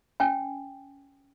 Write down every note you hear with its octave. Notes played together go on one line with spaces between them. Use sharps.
C#4 G5 G#5